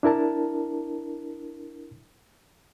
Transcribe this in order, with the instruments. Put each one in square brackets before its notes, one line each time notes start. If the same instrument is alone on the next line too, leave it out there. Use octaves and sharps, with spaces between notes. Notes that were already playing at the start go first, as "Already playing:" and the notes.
[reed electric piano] D4 E4 A#4 A5